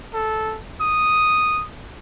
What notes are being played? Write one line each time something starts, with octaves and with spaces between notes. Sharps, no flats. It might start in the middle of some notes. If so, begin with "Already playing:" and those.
A4
D#6